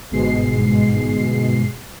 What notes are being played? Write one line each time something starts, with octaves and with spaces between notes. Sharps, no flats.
G1 G#2 B2 G#3 C7